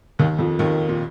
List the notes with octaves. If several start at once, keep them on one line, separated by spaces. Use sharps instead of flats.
D#2 D#3
F2 F3
D#2 D#3
A#2